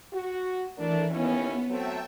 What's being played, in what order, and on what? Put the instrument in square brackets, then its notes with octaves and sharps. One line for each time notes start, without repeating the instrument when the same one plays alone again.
[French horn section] F#4
[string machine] E3 [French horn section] A3 D4 A#4
[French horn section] D#2 C#4 E4 [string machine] B3
[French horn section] F#3 A3 C4 [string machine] E5 G5 A5